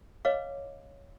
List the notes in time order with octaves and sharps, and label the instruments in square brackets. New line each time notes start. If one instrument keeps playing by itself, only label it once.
[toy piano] B4 C#5 D#5 F5 D6